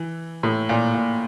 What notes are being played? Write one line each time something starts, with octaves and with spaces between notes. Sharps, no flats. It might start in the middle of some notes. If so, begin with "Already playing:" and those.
Already playing: E3
A2
A#2
A#2